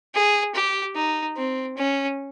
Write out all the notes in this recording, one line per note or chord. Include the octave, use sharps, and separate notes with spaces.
G#4
G4
D#4
C4
C#4